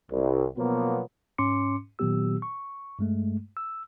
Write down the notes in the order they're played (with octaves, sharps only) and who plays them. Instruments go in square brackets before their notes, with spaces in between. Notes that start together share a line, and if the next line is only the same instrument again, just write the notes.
[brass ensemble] C2
B2 F3 F#3 A#3 B3
[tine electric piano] G#2 C#4 C6 D6 C#7
A#2 D#3 F#3 B3 G4 E6
C#6
G2 G#3 A3
E6